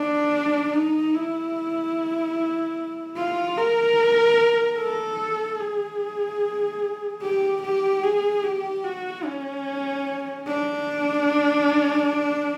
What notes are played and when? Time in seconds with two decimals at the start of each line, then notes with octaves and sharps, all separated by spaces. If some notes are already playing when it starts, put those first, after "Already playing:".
Already playing: D4
0.73 D#4
1.14 E4
3.16 F4
3.57 A#4
4.78 A4
5.60 G#4
7.22 G4
7.62 G4
8.03 G#4
8.44 G4
8.84 F#4
9.25 C#4
10.46 D4